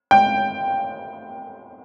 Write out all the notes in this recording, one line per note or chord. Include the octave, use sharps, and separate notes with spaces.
G5